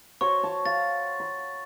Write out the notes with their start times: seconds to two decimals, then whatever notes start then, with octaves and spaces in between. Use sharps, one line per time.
0.21 F#4 C5 C#5 C#6
0.44 A5
0.66 F5 A6
1.20 B5